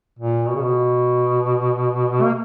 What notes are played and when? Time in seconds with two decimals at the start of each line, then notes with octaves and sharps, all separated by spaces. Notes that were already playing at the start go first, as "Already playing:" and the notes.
0.19 A#2
0.48 B2
0.55 C#3
0.63 B2
2.22 A#3